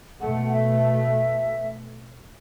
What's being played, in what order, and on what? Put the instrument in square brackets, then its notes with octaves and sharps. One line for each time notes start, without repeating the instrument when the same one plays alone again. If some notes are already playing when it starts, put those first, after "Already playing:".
[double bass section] B2 A3 [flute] F#5
[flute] E5